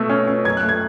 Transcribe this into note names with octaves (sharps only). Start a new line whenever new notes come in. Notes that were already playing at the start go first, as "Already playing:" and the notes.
Already playing: B2 A3 E6
C#4
C#4
F#2 G#6
F#6
A3
G#6